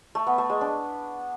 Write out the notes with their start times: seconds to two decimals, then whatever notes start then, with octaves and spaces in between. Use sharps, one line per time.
0.15 A3
0.27 B3
0.38 A3
0.50 G#3
0.61 D4